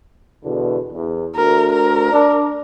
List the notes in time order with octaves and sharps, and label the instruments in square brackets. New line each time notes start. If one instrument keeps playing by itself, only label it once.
[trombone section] E2 B2 D3
E2
[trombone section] D2 [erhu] A#4
[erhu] A#4
[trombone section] D4